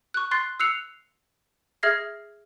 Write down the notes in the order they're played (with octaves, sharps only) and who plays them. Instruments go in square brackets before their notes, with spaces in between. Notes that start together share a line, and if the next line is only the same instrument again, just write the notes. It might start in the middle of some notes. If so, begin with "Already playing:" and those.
[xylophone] C#6 F#6
C6 F#6 A6 C7
E6 F#6 C7 C#7 F7
G#4 E5 F6 G#6 A#6 C7